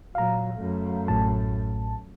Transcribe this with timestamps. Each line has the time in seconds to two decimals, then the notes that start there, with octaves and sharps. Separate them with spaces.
0.15 A#2 F#3 F5 A#5
0.55 F#2 A3
1.08 A1 A2 A5